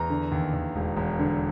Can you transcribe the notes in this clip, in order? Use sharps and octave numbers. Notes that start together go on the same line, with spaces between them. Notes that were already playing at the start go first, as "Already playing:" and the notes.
Already playing: E2 A#5
D3
D#2
D#2
E1
E1
D3